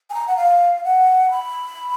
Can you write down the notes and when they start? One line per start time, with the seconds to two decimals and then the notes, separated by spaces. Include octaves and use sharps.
0.10 G#5
0.14 A#5
0.27 F#5
0.37 F5
0.84 F#5
1.31 B5